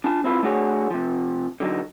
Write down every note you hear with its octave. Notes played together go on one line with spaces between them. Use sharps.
D4 F4 A5
C4 E4 F4 B4
A3 D4 F#4 G#4 C#5
C3 F3
D3 F#3 D#4